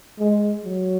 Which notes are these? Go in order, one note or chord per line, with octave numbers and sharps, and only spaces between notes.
G#3
F#3